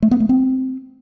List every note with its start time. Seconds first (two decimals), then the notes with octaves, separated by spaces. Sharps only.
0.02 A3
0.11 B3
0.20 A3
0.29 C4